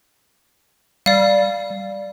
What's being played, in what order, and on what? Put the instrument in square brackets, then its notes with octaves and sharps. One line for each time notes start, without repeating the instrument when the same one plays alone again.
[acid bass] G3 [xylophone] D5 F5